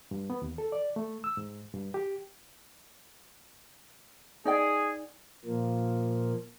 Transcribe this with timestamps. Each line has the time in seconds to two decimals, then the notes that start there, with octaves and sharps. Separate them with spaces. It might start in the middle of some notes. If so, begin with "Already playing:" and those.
0.11 G2
0.30 B3
0.42 D#2
0.58 A4
0.72 D5
0.96 A3
1.24 E6
1.37 G#2
1.74 G2
1.94 G4
4.45 D#4 G#4 D5 G5
5.45 A#2 F3 A#3